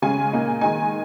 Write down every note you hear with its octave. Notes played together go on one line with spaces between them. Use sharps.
C#3 G#3 C#4 G#5
A#2 A#3 D#4
D#3 G#3 D#4 G#5